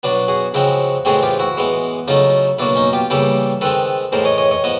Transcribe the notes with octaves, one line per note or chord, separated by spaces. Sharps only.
B2 F#3 B3 D4
F#4 G#4
C#3 F3 G#3 C4 E4 F#4
A2 E3 G#3 C4 F#4 G#4
F4 G4
E4 F#4
E3 G#3 B3
C#3 F#3 A3 D#4 F4
B2 F#3 A#3 D4 E4
C#4 D#4
F4 G4
C#3 E3 G3 A#3 G4 A4
D#3 G#3 C4 A4 B4
A2 E3 G#3 A#4 C5
C#5 D#5
C#5 D#5
C#5 D#5
F3 B3 D#5